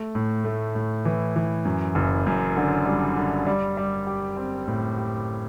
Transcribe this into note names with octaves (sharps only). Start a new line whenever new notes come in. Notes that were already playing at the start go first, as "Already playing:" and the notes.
Already playing: A3
A2
A3
A2
E3
E3
F#2
F#1
F#2
D3
G3
D3
G3
G3
G4
C4
A2
G4